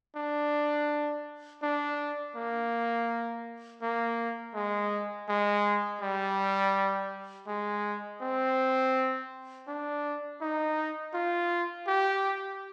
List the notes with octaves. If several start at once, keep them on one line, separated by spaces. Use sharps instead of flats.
D4
D4
A#3
A#3
G#3
G#3
G3
G#3
C4
D4
D#4
F4
G4